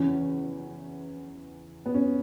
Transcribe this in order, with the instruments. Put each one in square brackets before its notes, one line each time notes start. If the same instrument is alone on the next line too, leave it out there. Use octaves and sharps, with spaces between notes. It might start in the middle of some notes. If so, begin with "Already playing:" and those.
Already playing: [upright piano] E2 C#3 E3 C#4
B3
C#4